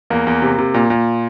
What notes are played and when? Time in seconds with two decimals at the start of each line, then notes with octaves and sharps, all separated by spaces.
0.10 E2 A#3
0.27 E2
0.42 C3
0.58 C3
0.74 A#2
0.90 A#2